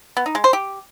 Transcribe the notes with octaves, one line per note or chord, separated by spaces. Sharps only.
B3
D#4
G#3
C5
G4